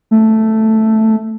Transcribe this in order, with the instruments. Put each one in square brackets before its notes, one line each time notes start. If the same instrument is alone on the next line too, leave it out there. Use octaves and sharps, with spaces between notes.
[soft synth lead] A3